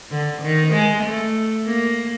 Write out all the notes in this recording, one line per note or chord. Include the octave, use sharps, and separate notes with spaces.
D3
D#3
G#3
A3
A#3